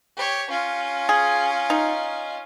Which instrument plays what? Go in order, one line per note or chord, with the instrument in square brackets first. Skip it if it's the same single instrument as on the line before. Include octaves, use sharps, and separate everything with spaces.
[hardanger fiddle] G4 C#5
C#4 F4
[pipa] G#4
D#4